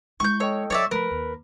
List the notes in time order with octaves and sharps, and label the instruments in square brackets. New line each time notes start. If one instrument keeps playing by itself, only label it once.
[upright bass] G#3 E4 [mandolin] C#6 G6
[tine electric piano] A4 D#5 G5 [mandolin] C#5
[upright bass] F#3 [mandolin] C#5 D5 E5
[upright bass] F3 A3 [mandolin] A#4 [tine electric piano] B4 B5
[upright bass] D#2